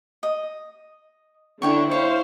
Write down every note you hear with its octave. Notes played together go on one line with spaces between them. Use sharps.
D#5
D3 D4 E4 C#5 G5 C#6
E4 C5 C#5 F5